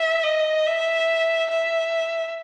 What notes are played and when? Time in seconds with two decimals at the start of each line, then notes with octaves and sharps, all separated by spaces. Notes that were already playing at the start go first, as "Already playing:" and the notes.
Already playing: E5
0.23 D#5
0.66 E5
1.50 E5